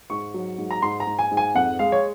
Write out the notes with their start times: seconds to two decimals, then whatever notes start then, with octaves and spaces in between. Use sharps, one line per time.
0.10 G#2 C#6
0.34 F#3
0.58 G#2
0.71 A#5
0.82 G#2 C6
1.00 A#5
1.07 G#2
1.19 G#5
1.31 G#2
1.37 G#5
1.55 F2 F#5
1.79 G#3 F5
1.92 C#5